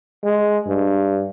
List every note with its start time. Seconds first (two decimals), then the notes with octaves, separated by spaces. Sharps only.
0.24 G#3
0.67 G2